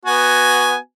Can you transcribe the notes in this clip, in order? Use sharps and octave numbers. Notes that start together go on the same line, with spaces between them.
B3 F#4 G#5